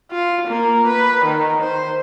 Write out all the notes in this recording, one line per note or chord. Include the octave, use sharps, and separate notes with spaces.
F4
A#3
B4
D#3
C5